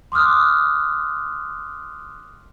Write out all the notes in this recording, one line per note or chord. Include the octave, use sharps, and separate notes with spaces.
C6 D6 D#6 F6 F#6